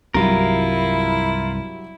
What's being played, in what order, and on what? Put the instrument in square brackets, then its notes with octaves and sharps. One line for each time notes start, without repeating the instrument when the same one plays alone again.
[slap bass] C2 G2 [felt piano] F#3 G3 [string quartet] E4 [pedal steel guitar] F4 A#4